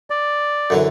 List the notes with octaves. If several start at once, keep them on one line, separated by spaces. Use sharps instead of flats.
D5
F#2 D3 E3